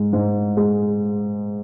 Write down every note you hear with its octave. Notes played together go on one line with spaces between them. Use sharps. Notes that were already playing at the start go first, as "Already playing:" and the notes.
Already playing: G#2 G#3
G#2
G#3